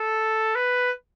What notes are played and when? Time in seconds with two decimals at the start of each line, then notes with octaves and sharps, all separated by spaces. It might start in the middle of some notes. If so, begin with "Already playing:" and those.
Already playing: A4
0.55 B4